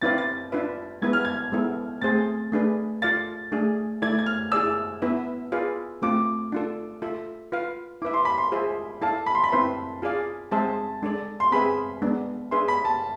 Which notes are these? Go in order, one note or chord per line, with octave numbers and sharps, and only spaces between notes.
C4 E4 B4 D5 F5 A6
A6
D4 F4 B4 E5
G#3 B3 E4 B4 G#6
F6
G#6
G#3 B3 E4 A4
A3 C4 G#4 C5 A6
A3 D4 G#4 B4
F4 A4 D5 F5 A6
A3 D4 G#4
A3 E4 A4 D5 G#6
G#6
F6
E4 G#4 D5 E6
B3 E4 B4 E5
F4 G#4 B4 D5 F5
A3 C4 F4 A4 D6
D4 F4 A4
F4 A4 E5
F4 B4 F5
E4 B4 E5 D6
C6
B5
C6
F4 G#4 C5 E5
E4 A4 D5 F5 A5
B5
C6
B5
C4 E4 B4 E5 C6
F4 G#4 D5 F5
G#3 C4 G#4 C5 E5 A5
G#3 D4 A4 D5
C6
C4 G#4 B4 E5 B5
G#3 B3 D4
D4 G#4 B4 E5 C6
B5
A5